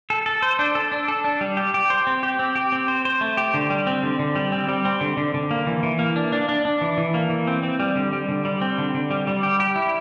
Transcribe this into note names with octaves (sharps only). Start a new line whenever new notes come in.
A4
A4
C5
D4
A4
D4
A4
D4
G3
G4
G4
C5
C4
G4
C4
G4
C4
C5
C5
A3
G4
D3
G3
C4
D3
D3
G3
C4
G3
C4
D3
D3
D3
A#3
E3
E3
A#3
D4
D4
D4
D4
E3
E3
A#3
E3
C4
C4
G3
D3
G3
D3
G3
C4
D3
D3
G3
G3
G4
G4
E4